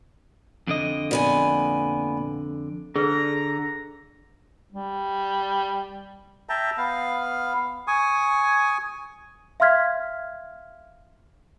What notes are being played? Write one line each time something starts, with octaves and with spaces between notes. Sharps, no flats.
F2 D3 D#5
A#2 B3 G#5
D3 G#4 B4 A#5
G3
E5 G5 A5 A#5
B3 F5
G#5 C#6 D#6
E5 F5 C6 F6 G#6 B6